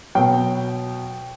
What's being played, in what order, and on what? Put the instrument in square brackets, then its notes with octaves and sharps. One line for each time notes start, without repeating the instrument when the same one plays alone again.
[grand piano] B2 F#3 G5